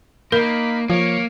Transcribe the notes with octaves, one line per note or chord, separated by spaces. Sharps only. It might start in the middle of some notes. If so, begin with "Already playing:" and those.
A#3 D#4 A#4 B5
F3 A#3 C#5